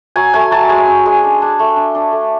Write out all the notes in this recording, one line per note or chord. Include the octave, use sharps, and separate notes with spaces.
F#3 G#5
A3 G#5
F#3 A5
G#3 G#5
C#4
G#3
D4
D4
A3
D4
D4
A3